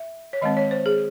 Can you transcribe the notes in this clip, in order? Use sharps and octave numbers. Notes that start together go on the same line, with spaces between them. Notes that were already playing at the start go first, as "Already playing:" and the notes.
Already playing: E5
C#5
D#3 G#3 C4 D#5
C#5
C5
G#4